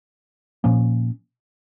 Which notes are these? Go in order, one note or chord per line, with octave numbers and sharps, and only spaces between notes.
A#2 F3 A#3 C#4